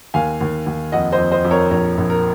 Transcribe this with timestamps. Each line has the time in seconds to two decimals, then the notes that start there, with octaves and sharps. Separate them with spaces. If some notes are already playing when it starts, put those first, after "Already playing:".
0.14 D#2 F5 G#5
0.41 D#2
0.66 D#2
0.92 F2 D#5 F#5
1.12 C5 D#5
1.18 F2
1.32 C5 D#5
1.45 F2
1.51 A#4 C#5
1.71 A#1 A#4 C#5
1.97 A#1
2.10 A#4